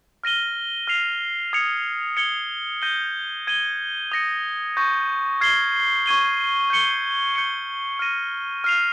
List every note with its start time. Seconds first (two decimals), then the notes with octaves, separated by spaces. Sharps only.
0.24 F6 A#6 D#7 G7
0.87 F6 C7 F7
1.53 D#6 G#6 C#7 F7
2.17 G#6 C#7 G7
2.82 G6 A#6 D#7 G7
3.47 G#6 D#7 G7
4.12 D#6 A#6 C#7
4.77 C#6 G6 A#6
5.41 F6 G#6 C7 G7
6.06 C#6 G#6 D#7 G7
6.70 G6 C#7 G7
7.36 G6 C#7 G7
7.99 F6 A#6 D#7
8.64 F6 C7 F7